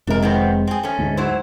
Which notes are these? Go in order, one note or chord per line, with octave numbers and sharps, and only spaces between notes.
F1 C3 G#3 D4 A#4
D#3 B3 C4
C4 G#4
A3 C#4
D2 G#2
F#3 E4 C5